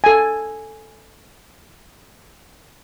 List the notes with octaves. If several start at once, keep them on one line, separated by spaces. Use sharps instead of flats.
A4 G#5